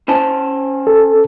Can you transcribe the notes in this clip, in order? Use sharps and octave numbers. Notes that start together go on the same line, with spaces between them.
C#4 C5 A5
A4